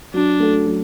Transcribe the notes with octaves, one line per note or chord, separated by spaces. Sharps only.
F#3 D4
A3 F#4 A4
F#3